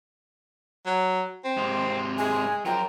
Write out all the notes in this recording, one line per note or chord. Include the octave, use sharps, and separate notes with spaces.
F#3
C4
G#2 C3
G#3 G#5
F3 F#3 A#4 G5